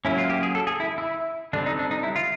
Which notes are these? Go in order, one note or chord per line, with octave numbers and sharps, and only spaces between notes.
F#3 A#3 C#4 E4
F4
G4
G#4
A4
G#4
E4
E4
D3 G3 C4 D4
D#4
D4
D#4
E4
F4